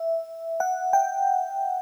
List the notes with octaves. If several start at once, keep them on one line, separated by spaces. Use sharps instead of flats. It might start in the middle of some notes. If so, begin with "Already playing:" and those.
Already playing: E5
F#5
G5